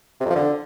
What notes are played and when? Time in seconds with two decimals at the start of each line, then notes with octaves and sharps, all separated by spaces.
0.20 C3
0.25 F2
0.30 F3
0.35 D3